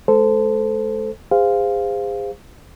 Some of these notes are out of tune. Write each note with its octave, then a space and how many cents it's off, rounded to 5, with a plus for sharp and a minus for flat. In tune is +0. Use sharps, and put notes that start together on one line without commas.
G#3 +40 A4 +0 C5 -15
G#4 -35 C5 -20 F5 +0